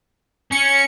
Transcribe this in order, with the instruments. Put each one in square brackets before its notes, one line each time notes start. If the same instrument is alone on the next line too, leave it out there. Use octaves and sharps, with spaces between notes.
[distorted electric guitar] C#4 [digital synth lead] C#7